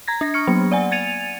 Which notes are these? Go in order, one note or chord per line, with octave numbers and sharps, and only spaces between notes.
A#5 G#6 A#6
D4 A#6
C#6 F6 C#7
F#3 A#3 B3
D5 F#5 G#5
G#6 A6 C#7 D#7 F7